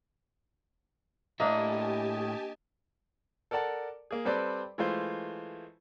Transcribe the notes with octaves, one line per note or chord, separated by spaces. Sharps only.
A2 A#3 D4 G4 D#5 E5 G#5 A5
A4 A#4 D5 F#5 A5
A#3 G#4
G3 C4 A4 B4 C5 D5
E3 G#3 A3 F4 C5